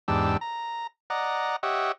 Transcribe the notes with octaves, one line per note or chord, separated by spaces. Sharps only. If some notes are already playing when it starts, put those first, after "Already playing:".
E2 G#2 D4 G4 E6
A#5
D5 D#5 F#5 A#5
G4 C#5 D#5 E5 F#5